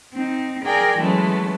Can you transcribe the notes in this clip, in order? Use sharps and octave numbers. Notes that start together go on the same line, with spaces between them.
C4 D#4
G#4 A#4 D5 G5 G#5
E3 F#3 G#3 A3 B3 C#4